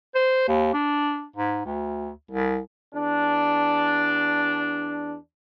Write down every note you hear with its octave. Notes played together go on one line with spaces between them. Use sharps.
C5
D#2
D4
G#2
D2
C2
E2 D4